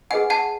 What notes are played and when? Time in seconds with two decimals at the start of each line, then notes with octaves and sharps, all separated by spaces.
0.10 G#4 B4 D#5 F#5 G#5
0.30 F#5 A5